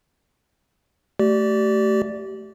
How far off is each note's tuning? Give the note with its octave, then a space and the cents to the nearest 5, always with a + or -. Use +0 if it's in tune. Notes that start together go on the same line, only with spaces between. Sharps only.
A3 +0 G4 -30 D5 +0